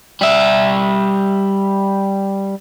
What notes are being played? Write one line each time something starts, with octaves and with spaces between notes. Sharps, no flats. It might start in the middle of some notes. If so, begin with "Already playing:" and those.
G3 E5